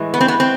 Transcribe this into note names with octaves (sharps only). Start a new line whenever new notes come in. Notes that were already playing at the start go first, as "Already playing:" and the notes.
Already playing: A2 E3 G#3
B3
C4
B3
C4